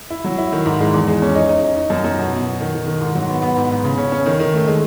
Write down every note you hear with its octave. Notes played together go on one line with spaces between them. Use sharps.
E4
F#3
E4
D#3
G#2
G#3
E2
G#3
C#4
D#4
D#4
D#4
D#4
F#2
F#2
B2
B2
B2
D#3
D#3
D#3
G#2
F#3
B3
B3
G#2
B3
C#3
C#4
C#4
D#3
D#3
A3
G#3